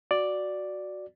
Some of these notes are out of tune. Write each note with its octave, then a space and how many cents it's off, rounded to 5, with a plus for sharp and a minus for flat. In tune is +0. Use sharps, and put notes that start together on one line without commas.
F#4 +0 D5 +0